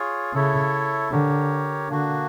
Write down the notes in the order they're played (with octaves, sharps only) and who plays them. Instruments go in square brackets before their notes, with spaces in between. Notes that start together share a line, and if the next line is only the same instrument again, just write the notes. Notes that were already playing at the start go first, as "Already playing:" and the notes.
Already playing: [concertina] F4 G#4 C#5
[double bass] C#3 [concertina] E4 A4 C#5 E5
[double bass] D3 [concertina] G4 A#4 C#5
[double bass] D3 [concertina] A#3 D4 F#4